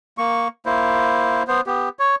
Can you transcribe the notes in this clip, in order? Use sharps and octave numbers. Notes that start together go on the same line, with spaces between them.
A#3 C#6
A#3 E4 C5
B3 C5
B3 G4
C#5